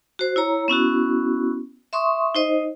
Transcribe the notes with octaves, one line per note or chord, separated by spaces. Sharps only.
F#4 C5
E4 C#5 A#5
B3 C#4 E4 F#4
E5 C6 C#6 D#6
D#4 C5 D#5